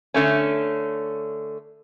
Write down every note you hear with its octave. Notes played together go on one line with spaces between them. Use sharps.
D3 A3 C#4